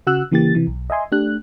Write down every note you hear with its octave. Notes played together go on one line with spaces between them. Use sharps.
C#3 F#4 F#5 E6 F#6
C#3 E3 A#3 G4 A6
C3 E3
B1
D#5 E5 G#5 C6
A3 D4 G4 F#6